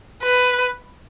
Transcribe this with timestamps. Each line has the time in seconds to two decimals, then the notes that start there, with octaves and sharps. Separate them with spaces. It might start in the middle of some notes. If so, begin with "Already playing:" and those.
0.22 B4